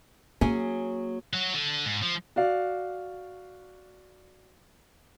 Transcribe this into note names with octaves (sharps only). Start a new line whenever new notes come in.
F#3 A#3 C#4 G#4
F#3 F#4
D3
G#2
F3
F#4 D5 F5